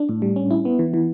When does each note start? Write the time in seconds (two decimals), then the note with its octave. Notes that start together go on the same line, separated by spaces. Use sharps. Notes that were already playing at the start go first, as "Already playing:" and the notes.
Already playing: D4
0.09 A2
0.22 G3
0.36 C#4
0.51 E4
0.65 B3
0.79 E3
0.94 E3